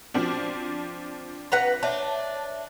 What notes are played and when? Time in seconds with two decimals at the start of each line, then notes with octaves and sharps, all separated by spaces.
0.14 F3 C4 D4
1.52 B4 F#5 A#5
1.83 D4 C#5 E5 A5